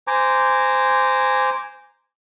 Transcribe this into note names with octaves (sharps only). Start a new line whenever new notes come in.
C5 G#5 A#5 D6